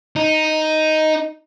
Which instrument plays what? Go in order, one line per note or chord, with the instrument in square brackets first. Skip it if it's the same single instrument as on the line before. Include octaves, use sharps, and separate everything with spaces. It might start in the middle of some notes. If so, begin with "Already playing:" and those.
[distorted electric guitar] D#4